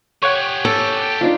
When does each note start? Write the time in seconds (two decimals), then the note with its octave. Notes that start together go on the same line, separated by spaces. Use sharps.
0.22 G4 C#5 F#5 G#5
0.65 A4
1.21 D4 D#4 F4